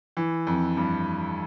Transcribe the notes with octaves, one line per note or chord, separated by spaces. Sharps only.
E3
F2
G2